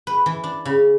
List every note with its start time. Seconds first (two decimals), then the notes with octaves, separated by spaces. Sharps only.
0.07 B4
0.26 E3
0.44 D4
0.65 C#3